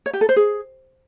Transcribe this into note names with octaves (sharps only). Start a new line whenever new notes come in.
C#5
G4
A4
C5
G#4